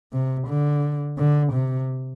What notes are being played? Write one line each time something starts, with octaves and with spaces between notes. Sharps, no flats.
C3
D3
D3
C3